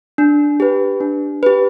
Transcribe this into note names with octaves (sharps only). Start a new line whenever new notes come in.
D4
G4 B4
D4
G4 B4